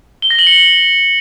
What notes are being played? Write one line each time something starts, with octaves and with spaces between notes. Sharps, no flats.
G7
A#6
F#7
C#7